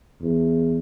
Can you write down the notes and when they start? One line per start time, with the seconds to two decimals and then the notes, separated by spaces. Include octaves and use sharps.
0.22 E2